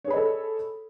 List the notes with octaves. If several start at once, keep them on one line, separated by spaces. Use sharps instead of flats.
G#4 A4 C#5 D#5 B5